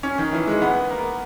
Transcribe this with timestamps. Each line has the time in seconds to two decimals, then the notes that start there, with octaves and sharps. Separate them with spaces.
0.03 C#4
0.18 D#3
0.32 E3
0.47 G#3
0.62 B3
0.90 A#3